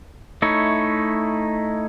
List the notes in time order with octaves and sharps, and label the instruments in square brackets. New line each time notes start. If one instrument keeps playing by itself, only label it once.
[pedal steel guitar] A3 D#4 E4 C#5